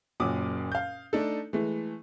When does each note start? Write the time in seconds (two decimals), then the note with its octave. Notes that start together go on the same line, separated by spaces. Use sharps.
0.20 F#1 A#2 F#3 D6 D#6
0.72 F5 G6
1.13 A3 D4 D#4 A4
1.53 E3 G#3 A3